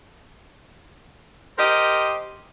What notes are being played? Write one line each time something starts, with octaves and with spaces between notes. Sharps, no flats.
G4 A#4 C5 D#5